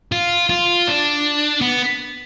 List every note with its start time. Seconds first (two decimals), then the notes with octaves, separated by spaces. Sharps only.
0.12 F4
0.49 F4
0.87 D4
1.61 B3